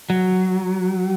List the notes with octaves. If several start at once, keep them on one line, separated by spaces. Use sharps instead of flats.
F#3